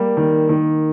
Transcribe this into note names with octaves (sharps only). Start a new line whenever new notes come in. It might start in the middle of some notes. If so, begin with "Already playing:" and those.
Already playing: G3 A#3
D#3
D#3